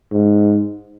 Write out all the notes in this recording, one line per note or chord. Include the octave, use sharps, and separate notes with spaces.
G#2